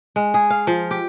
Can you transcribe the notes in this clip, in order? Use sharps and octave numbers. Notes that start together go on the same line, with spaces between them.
G#3
G#4
F5
F3
G4